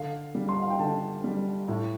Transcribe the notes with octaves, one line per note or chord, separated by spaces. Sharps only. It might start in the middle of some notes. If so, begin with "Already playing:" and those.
Already playing: D3 F5
G3
C6
F5
G5
D3 A5
G3
A2